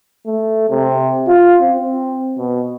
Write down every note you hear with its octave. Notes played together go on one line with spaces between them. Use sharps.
A3
C3
F4
C4
B2